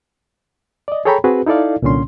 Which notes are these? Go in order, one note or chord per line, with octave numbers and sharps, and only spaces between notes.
D5 D#5
G#4 A4 C#5 G5 A#5 B5
C4 F#4 G#4 B4
D#4 E4 A4 D5 F5
C2 A#2 D3 C#4 C6